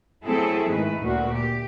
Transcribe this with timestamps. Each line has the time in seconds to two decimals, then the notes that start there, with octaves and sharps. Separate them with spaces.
0.24 F#3 A3 C4 E4 G#4 A4
0.67 G#2 D#3 A3 B4
1.00 D2 A#2 A3 F#4
1.32 G4